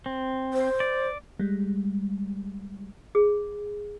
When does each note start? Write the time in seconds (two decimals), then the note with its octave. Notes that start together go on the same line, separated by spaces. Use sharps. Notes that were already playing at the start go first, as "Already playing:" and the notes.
0.06 C4
0.54 C5
0.80 D5
1.39 G3 G#3
3.15 G#4